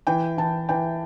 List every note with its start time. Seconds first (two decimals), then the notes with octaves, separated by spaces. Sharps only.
0.07 E3 G5
0.37 E3 A5
0.69 E3 G5